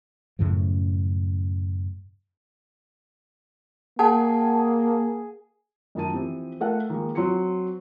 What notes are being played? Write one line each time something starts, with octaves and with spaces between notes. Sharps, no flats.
F#2 A2 C#3 F3
A#3 G#4 F#5 G5 A5
F#2 D#3 D#4 A5 D#7
E3 F3 C4 G4
A3 A4 A#4 F5 F#5
D#3 F3 G#3 A#3
F#3 C4 C6 C#7